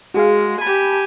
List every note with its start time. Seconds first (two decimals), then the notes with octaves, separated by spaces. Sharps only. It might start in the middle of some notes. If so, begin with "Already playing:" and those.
0.14 G#3 F#4 G#4 F5
0.61 G4 G#5 A5 B5